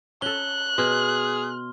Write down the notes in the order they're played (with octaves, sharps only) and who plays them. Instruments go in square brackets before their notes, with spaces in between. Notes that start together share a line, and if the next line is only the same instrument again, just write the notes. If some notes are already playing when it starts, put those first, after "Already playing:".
[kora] C#4 A4 [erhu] F#6 [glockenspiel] G7
[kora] B2 [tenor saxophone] G#4 [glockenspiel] C6 F6